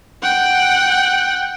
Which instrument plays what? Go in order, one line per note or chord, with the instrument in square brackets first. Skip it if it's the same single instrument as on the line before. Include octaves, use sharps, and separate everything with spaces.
[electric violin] F#5 G5